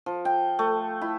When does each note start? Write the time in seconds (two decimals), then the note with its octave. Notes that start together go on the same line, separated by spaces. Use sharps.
0.06 F3
0.25 G5
0.59 A3
1.01 E4